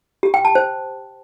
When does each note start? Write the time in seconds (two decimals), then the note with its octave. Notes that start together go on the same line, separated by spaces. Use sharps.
0.23 G4
0.34 G5
0.45 A5
0.55 C5